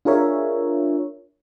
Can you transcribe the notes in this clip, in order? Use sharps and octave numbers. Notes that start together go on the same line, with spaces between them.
D4 F4 G#4 A#4 C#5 E5